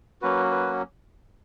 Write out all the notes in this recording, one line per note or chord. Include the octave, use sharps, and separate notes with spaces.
F#3 A#3 C#4 F#4 B4
B4